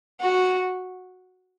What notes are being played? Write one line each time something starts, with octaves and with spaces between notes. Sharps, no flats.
F#4